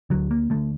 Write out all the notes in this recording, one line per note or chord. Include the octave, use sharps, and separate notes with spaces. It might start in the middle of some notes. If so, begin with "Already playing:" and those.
D2 D3 F#3
A#3
D2 D3 A3